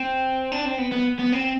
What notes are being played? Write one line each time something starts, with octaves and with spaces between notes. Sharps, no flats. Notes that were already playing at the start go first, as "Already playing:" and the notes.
Already playing: C4
D4
C4
B3
B3
B3
C4